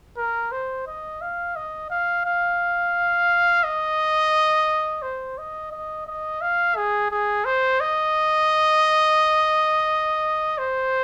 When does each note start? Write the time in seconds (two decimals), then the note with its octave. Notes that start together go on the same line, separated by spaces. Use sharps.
0.17 A#4
0.52 C5
0.87 D#5
1.21 F5
1.56 D#5
1.90 F5
2.25 F5
3.64 D#5
5.02 C5
5.38 D#5
5.72 D#5
6.07 D#5
6.41 F5
6.76 G#4
7.11 G#4
7.45 C5
7.80 D#5
10.58 C5